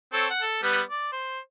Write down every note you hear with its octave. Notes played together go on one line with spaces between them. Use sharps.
C4 A4 C#5
F#5
A4
G3 B3 B4
D5
C5